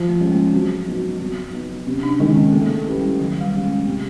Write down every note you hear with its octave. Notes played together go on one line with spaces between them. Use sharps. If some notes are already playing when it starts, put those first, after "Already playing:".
Already playing: F3
A3
G#3 C#4
A#3
A3
F#3 C4
B3 D#4 F#4
F#3 C4
B3 D#4
C3 C#4
D4
D#3 G#3 C#4 D#4
C4
A3 A#3
A3
C#4 E4 G4 B4
G3
D#3 F#3
G3
G#3 C#4
A3
C3 A3